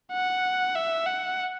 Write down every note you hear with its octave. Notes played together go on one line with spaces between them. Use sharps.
F#5
E5
F#5